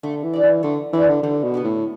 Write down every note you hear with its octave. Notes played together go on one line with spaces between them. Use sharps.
D3 A3
E3
G4 D5
E3
D3 A3
E3 G4 D5
D3
D3 G3
B2
B3 G4 B4
A2